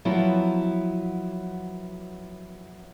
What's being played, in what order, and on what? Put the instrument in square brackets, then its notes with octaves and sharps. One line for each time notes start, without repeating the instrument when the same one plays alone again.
[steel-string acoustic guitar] F3 F#3 B3 E4